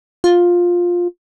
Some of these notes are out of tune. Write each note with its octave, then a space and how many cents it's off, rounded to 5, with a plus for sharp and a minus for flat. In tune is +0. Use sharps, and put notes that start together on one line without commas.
F4 +10